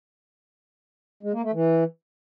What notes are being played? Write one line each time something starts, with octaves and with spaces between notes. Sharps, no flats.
G#3
A#3
A3
E3